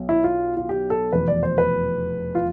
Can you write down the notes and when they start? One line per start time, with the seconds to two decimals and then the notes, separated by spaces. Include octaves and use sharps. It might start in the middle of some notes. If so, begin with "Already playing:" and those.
Already playing: B1 B2
0.09 E4
0.24 F4
0.57 F4
0.69 G4
0.90 A4
1.12 F1 E2 B2 B4
1.28 D5
1.43 C5
1.58 B4
2.35 F4